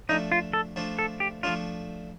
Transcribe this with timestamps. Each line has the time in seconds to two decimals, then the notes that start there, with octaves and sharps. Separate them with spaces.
0.09 F3 A3 D4 D#4
0.32 F4
0.53 A4
0.76 F3 A3 D4
0.99 A4
1.20 G4
1.43 F3 A3 D4 F4